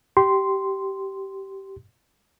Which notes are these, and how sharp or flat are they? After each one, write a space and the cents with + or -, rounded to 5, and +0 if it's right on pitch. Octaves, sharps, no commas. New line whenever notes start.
G4 -15 C6 -5